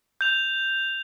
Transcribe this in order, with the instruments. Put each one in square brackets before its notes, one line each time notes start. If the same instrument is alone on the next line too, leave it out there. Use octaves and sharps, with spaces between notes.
[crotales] G6 F7